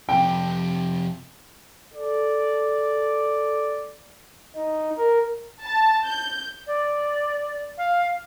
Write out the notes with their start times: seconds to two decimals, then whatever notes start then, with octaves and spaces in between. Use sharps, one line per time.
0.09 F2 C3 G5
1.94 A4 D5
4.56 D#4
4.97 A#4
5.64 A5
6.06 G6
6.67 D5
7.78 F5